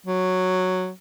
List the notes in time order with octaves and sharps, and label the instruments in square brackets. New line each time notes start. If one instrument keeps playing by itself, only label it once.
[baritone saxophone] F#3